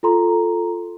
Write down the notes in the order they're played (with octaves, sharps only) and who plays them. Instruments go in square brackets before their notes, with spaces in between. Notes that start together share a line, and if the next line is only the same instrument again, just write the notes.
[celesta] F4 A4 A#5 C6